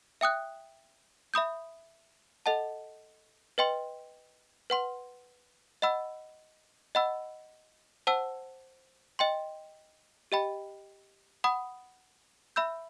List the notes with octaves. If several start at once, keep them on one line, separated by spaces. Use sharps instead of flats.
E5 G5 D#6 F#6
E5 B5 D#6 G6
A4 D#5 F#5 A5
B4 D#5 G5 C6
B4 F#5 C6
D#5 F#5 B5 E6
D#5 F#5 B5 E6
C5 F#5 A5 E6
D#5 G5 C6
G4 D#5 G5 B5
F#5 B5 D#6
E5 B5 E6 G6